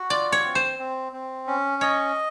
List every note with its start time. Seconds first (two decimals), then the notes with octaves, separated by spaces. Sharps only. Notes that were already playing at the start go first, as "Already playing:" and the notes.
Already playing: F#4
0.10 F4 D5
0.32 C#5
0.44 C4
0.55 C5
0.79 C4
1.12 C4
1.47 C#4
1.81 C#5 D#5